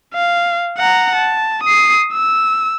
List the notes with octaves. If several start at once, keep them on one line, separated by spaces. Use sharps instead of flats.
F5
F#5 A#5
A5
D#6 C7
E6